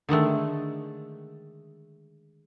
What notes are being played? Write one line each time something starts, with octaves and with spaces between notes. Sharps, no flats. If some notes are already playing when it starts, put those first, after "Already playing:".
D3 D#3 G#3 A3